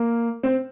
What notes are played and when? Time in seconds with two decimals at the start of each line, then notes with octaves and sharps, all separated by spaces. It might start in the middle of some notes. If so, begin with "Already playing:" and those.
Already playing: A#3
0.43 C4